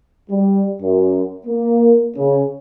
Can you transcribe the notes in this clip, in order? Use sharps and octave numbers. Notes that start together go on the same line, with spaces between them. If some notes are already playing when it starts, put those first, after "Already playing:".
G3
F#2
A#3
C#3